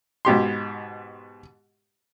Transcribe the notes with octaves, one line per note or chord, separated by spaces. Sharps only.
G#2 B2 G4 C6